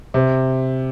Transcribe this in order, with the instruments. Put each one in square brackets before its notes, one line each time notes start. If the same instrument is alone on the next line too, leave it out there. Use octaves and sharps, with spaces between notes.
[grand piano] C3